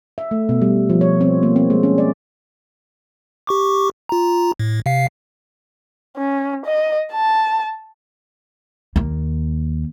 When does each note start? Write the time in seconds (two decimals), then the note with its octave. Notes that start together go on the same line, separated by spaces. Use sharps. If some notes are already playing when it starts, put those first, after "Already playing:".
0.18 E5
0.31 A3
0.49 B2
0.62 G3
0.90 F3
1.01 C#5
1.21 C4
1.43 A#3
1.56 C4
1.70 G#3
1.83 C#4
1.98 D5
3.47 G4 C#6 D6
4.09 F4 A#5
4.59 A2
4.86 C3 F5 C7
6.17 C#4
6.66 D#5
7.13 A5
8.96 D#2 A#3